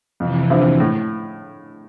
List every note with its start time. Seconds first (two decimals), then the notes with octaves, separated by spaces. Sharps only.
0.20 F2 C3 E3
0.50 D3 F3 C4 E4
0.80 A2